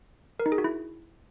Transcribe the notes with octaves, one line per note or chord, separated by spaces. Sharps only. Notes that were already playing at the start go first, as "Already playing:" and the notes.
A#4
D#4
G#4
F#4
E4